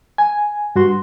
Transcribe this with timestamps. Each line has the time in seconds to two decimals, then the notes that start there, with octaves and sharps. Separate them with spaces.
0.18 G#5
0.75 G2 F#4 C6